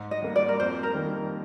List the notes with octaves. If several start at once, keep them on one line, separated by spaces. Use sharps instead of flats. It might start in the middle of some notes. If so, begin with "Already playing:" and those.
Already playing: G#2
D#5
G3 A#3
D5
A#4
F2 C5
A#4
D#3 G3 A#3